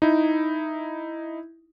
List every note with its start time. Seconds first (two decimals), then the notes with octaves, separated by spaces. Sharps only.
0.02 D#4 E4